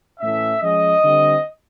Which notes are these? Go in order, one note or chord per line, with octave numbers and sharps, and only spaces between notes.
A2 E3 A3 C#4 E5
F3 G#3 C#4 D#5
D3 G3 C4